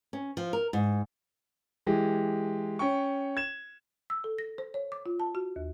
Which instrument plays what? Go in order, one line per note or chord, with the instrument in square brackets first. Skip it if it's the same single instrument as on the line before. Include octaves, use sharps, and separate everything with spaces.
[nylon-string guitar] C#4
F3
A#4
G#2
[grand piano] E3 G#3 G4
C#4 G5 C#6
G#6 E7
[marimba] E6
A4
A#6
C5
C#5
D6
F4
A5
F#4
D#2